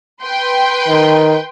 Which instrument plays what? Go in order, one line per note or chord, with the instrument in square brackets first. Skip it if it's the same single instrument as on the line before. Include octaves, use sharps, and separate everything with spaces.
[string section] B4 G5 C6
[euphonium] D#3